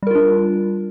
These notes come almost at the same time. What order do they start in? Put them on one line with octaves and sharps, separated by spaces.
G3 A#4 F4 D4